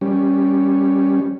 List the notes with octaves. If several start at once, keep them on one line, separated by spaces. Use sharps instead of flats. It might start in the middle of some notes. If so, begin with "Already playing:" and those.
G3 C#4